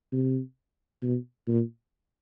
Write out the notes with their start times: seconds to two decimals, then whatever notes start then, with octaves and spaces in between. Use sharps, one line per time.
0.13 C3
1.02 B2
1.48 A#2